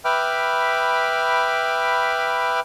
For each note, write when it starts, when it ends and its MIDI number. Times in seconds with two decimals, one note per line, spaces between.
0.05 2.60 71
0.05 2.60 76
0.05 2.60 79
0.05 2.60 83
0.05 2.60 86
0.05 2.60 89